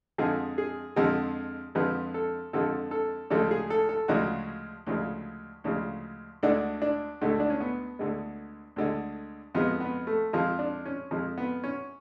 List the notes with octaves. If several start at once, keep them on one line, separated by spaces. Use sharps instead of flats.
F2 D3 F3 G#3 G#4
G#4
F2 D3 F3 G#3
F2 D3 F3 G#3 B4
A4
F2 D3 F3 G#3 A4
A4
D2 C#3 F3 G#3 A4
G#4
A4
A4
D2 C#3 F3 G#3 F#4
D2 C#3 F3 G#3
D2 C#3 F3 G#3
D2 D3 G#3 D4
D4
D2 D3 G#3 A3
D4
C#4
B3
D2 D3 G#3
D2 D3 G#3
F2 F3 G#3 B3
B3
A3
F2 F3 G#3 F4
D4
C#4
F2 F3 G#3
B3
C#4